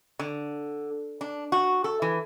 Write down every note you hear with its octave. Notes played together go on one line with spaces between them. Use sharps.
D3
D4
F#4
A4
E3